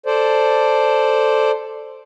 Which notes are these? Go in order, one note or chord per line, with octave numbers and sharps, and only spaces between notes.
A4 C5 D5